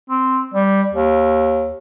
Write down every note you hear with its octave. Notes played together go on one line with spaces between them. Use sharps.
C4
G3
D#2